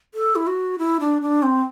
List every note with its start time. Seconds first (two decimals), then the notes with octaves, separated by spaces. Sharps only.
0.14 A4
0.36 E4
0.47 F#4
0.79 E4
1.00 D4
1.22 D4
1.43 C4